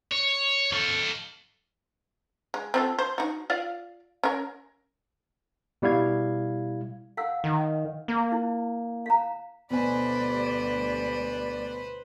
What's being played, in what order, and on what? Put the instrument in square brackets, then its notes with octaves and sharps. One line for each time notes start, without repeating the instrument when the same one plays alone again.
[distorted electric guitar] C#5
A4 F5
[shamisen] G#3
C4 F4 A4
C5
D#4 F#4
F4 D5 F5
C#4 A#4
[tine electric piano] B2 G3 E4 F5 G#6
[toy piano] F5 F#5 E6
[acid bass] D#3
A#3
[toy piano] E4
F5 A#5
[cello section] D2 G3 D5 [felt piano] B2 G#5 [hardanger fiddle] B4 C5